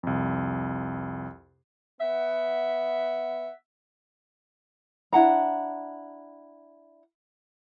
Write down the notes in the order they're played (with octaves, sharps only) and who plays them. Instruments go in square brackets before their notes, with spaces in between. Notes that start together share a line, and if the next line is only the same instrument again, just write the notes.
[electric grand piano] C2 F2
[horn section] B3 E5 F#5
[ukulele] D4 E4 F#5 A#5